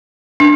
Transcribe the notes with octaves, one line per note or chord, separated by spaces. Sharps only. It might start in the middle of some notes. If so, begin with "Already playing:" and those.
D4